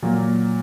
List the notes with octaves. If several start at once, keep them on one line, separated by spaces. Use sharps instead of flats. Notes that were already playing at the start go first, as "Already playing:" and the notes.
A#2 F#3 A#3